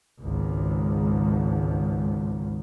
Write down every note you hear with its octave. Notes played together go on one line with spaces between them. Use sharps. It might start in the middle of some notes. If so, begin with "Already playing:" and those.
G#1 C#2